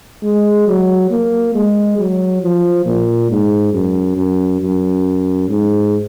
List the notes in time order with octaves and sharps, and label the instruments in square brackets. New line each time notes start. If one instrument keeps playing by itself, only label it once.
[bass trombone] G#3
F#3
A#3
G#3
F#3
F3
A#2
G#2
F#2
F#2
F#2
G#2